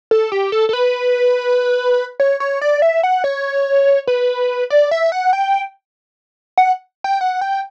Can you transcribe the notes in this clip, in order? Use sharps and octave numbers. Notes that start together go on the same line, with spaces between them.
A4
G4
A4
A4
B4
C#5
C#5
D5
E5
F#5
C#5
B4
D5
E5
F#5
G5
F#5
G5
F#5
G5